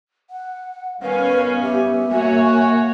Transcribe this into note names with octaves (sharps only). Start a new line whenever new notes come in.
F#5
D#3 G3 B3 C#4 B4 F5 G#5
G4 E5
A#3 F#4 C#5 G#5